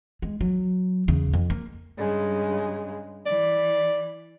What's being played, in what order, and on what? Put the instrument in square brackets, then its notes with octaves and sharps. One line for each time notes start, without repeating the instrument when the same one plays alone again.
[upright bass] G#3
F#3
E2 C#3
F2
A#3
[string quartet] G2 C#3 G#3
[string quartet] E3 [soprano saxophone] D5